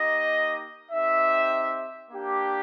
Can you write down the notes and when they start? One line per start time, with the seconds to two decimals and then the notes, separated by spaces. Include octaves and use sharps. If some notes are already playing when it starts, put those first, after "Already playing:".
Already playing: A#3 D#4 G4 D#5
0.91 C4 D#4 G4 E5
2.10 A#3 D4 G4